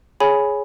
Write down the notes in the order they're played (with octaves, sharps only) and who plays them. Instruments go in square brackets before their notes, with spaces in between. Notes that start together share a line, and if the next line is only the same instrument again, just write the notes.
[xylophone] G#4 C#5 G#5 B5